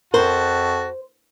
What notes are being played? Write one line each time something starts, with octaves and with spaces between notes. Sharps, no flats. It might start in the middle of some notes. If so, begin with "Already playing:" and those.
F2 F#4 A#4 C5 A5